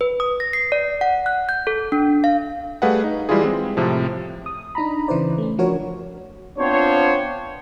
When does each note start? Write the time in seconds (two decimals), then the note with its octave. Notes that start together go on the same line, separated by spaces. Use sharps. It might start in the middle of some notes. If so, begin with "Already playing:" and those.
0.01 B4
0.20 D#6
0.40 A#6
0.53 C7
0.72 D5
1.01 F#5
1.26 F#6
1.49 G6
1.67 A4
1.92 D4
2.24 F5
2.82 G3 A3 G#4 B4 F5 F#5
3.04 D#4
3.29 E3 G3 G#3 E4 F4 G#4
3.44 G#3 C4
3.77 A2 C3 F3
4.46 D#6
4.75 D4 D#4 A#5 B5
5.08 C#3 E3 E4 B4 C5 D5
5.38 A3 C#4
5.58 F3 D4 F#4 A#4 C#5
6.58 B3 C4 D4 F4 C5 C#5